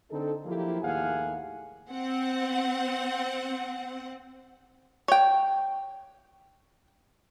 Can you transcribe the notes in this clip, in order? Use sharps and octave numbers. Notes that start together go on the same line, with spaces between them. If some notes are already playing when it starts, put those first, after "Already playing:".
D3 C4 D#4 A4
F3 F#3 A#3 E4 F4 G4
D#2 A2 G#4 F5 F#5 G#5
C4 F#5
C#5 G5